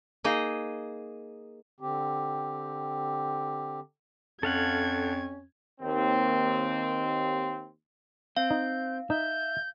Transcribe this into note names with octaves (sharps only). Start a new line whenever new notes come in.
A#3 D#4 G#4 D#5
D3 C4 G4
F2 C#4 A4 F5 F#5 G#6
D#2 C4
C4 F5 G6
D#4
D#4 E5 G6